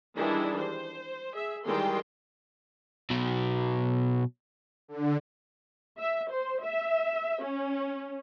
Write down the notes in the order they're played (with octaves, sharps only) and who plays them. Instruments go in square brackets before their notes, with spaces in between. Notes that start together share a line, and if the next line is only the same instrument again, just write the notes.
[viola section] D#3 E3 G3 G#3 D4 E4
C5
G#4 E5
D#3 E3 G3 G#3 G5 C6
[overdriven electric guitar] B2 F#3
[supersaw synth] D3
[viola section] E5
C5
E5
C#4